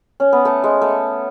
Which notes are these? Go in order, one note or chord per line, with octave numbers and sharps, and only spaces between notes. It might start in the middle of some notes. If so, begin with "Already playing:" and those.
C#4
B3
A3
G#3
A3